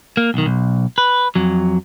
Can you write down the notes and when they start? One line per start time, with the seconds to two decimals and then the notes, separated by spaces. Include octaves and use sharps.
0.17 A#3
0.34 B1 D#3
0.46 B1
0.98 B4
1.35 F2 F#3